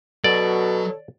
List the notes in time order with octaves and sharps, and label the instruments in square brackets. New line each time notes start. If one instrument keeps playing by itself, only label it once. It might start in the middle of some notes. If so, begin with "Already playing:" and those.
[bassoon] B2 [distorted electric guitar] F#3 F#4 [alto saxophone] A4 [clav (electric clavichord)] D5